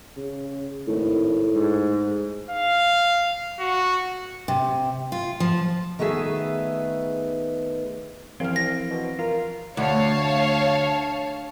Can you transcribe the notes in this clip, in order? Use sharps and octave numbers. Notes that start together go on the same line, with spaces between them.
C#3
G#1 A2
G#2
F5
F#4
C3
F4
F3
D#3 A3 B3 G#4 E5
C2 E3 F3 C4 F6
A#6
B2
F4 A#4
D2 C#5 F5 A5